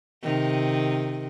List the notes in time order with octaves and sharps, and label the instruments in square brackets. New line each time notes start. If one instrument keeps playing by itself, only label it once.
[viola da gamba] C3 D#3